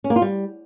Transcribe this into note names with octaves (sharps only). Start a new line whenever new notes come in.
C#4
A#3
F4
G3